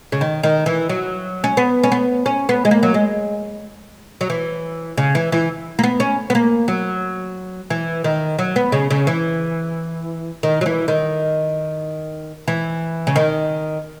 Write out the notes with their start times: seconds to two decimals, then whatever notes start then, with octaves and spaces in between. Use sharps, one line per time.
0.12 C#3
0.21 D#3
0.43 D#3
0.66 E3
0.89 F#3
1.44 C#4
1.57 B3
1.84 C#4
1.92 B3
2.26 C#4
2.49 B3
2.65 G#3
2.71 A#3
2.83 F#3
2.94 G#3
4.21 F#3
4.30 E3
4.98 C#3
5.15 E3
5.32 E3
5.79 A#3
5.83 B3
6.00 C#4
6.30 B3
6.35 A#3
6.68 F#3
7.70 E3
8.04 D#3
8.39 F#3
8.56 B3
8.72 C#3
8.90 C#3
9.07 E3
10.43 D#3
10.61 F#3
10.66 E3
10.88 D#3
12.48 E3
13.07 C#3
13.16 D#3